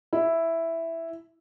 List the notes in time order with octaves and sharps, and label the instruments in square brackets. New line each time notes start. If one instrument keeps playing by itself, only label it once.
[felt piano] E4